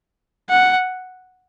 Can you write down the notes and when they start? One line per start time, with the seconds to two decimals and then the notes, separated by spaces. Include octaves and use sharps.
0.50 F#5